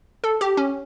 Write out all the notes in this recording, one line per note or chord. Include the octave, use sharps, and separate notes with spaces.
A4
G4
C#4